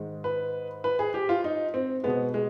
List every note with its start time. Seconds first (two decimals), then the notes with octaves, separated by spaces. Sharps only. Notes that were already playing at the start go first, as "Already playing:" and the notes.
Already playing: G#2 D#3 G#3
0.24 B4
0.84 B4
0.99 G#4
1.14 G4
1.29 F4
1.44 D#4
1.74 C4
2.04 B2 G#3 B3
2.34 G#3